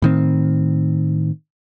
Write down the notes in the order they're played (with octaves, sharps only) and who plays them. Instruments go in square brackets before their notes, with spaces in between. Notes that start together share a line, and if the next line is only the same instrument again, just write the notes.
[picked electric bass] A2 D#3 C4